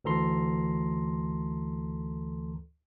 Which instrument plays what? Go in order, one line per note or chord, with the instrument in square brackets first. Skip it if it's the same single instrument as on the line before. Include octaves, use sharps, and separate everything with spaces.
[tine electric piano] D2 E3 A4 A#5 C6